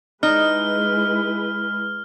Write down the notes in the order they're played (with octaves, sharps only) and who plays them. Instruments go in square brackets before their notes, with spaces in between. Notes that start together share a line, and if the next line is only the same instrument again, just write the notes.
[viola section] G#3 E4 B4 [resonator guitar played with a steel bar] D#4 [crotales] F6